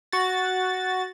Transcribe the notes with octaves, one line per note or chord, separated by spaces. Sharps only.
F#4 A6